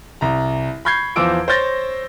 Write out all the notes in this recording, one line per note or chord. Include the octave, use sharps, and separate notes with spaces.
C2 A#5
B5 C#6 G6 G#6 C7
E2 F3 C5 D6 E6 D7
C5 C#5 G6 A6 A#6